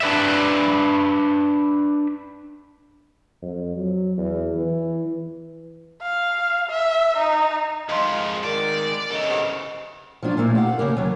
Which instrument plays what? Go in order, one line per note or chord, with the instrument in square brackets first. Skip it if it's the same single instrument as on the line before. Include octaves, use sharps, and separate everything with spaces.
[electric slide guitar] D4 B4 D5 E5
[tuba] F2
F#3
E2
E3
[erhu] F5
E5
D#4
[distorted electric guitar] F2 [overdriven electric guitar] D#3 G#3 [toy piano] D#5 C6 [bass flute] F5
[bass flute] A#4 [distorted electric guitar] D5
[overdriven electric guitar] C#3 E3 [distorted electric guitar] A4 A#5 [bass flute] D#5
[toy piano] G4 C5 F#5
[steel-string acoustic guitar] F3 F#3 D4 F4
A#2 A3 A#3 E4
G4 F5 F#5
C#3 G#3 A#3 G4 A#4
D#2 F#3